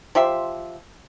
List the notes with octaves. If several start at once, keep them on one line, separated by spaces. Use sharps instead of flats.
F3 G4 E5 C6